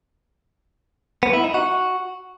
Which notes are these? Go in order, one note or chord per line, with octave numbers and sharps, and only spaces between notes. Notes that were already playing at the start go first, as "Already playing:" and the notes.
B3
E4
D#4
F#4